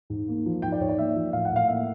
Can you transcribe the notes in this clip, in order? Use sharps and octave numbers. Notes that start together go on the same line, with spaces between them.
G#2
A#3
F3
G#2 G5
D5
G#2 C#5
D5
A#3 E5
F3
A2 F5
F#5
A2
F5
A#3 E5